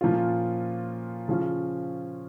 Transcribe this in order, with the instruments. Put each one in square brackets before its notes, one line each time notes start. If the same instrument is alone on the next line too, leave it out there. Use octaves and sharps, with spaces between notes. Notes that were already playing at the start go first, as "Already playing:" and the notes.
[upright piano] A#2 F3 C#4 F4
C#3 F3 C#4 F4